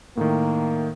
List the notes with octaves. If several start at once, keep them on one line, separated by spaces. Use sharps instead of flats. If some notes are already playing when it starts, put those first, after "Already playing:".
A2 D#3 A#3